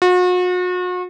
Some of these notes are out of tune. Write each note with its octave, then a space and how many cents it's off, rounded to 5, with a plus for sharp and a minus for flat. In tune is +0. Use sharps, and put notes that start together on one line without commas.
F#4 -40